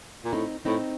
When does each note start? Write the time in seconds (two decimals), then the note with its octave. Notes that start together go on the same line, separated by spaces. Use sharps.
0.25 A#2
0.33 A2 C4 D#4
0.65 A2 C4 D#4